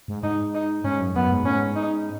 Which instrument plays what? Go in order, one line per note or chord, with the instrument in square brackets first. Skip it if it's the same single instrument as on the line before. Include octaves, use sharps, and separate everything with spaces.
[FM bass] G#2
[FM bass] G#2 [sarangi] D#4
[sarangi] D#4
[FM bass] G#2 [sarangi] C#4
[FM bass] F#2
[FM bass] F#2 [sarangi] B3
[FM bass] G#2
[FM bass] A2 [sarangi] C#4
[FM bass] G#2
[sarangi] D#4